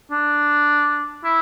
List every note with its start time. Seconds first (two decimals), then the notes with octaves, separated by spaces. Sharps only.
0.11 D4
1.25 E4